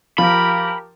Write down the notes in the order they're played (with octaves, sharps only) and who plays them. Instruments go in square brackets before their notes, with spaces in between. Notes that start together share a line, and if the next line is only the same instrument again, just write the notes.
[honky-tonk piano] F3 [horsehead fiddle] G4 A#4 [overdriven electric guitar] B5